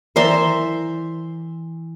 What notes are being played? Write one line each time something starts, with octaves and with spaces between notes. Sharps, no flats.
E3 A#4 C5 D5 E5 A#5 C6